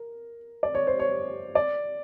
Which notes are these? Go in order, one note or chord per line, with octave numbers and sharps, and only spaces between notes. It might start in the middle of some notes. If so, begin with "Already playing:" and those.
Already playing: A#4
D5
C#5
C5
C#5
D5